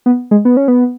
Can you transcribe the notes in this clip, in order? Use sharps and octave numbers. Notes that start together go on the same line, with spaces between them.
B3
G#3
B3
C#4
B3